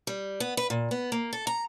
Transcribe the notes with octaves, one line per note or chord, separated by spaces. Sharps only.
G3
B3
B4
A#2
B3
A#3
A4
A#5